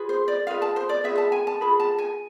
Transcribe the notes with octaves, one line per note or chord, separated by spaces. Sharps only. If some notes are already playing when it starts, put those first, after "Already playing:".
Already playing: F4 G#4 B4
C5
D5
F4 G#4 B4 F5
A5
C5
D5
F4 G#4 B4 E5
A5
G#5
A5
F4 G#4 B4 B5
A5
G#5